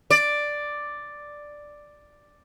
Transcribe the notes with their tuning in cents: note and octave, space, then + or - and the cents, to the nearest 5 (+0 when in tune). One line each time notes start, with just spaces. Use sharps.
D5 +5